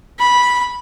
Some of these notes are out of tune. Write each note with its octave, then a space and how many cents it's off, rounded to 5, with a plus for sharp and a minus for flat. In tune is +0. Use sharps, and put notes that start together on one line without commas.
B5 -10